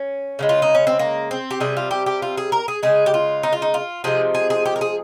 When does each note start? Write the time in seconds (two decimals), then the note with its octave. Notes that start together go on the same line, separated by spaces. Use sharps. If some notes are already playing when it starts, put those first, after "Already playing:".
Already playing: C#4
0.39 C#3 F3 G#3
0.49 F4
0.62 D#4
0.75 C#4
0.87 C4
0.99 A#3
1.31 C4
1.51 G4
1.60 C3 G3 G#4
1.77 F4
1.91 G4
2.06 G4
2.22 F4
2.37 G#4
2.52 A#4
2.68 G#4
2.83 C#3 G#3 G#4
3.06 G4
3.14 F4
3.43 D#4
3.53 F4
3.62 D#4
3.74 F4
4.04 C3 F3 G#3 G#4
4.35 G#4
4.50 G#4
4.66 G4
4.76 A#4
4.81 G#4